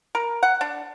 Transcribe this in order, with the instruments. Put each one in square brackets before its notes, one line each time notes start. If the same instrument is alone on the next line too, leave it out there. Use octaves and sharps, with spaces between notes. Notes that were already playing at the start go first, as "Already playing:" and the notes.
[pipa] A#4
F#5
D4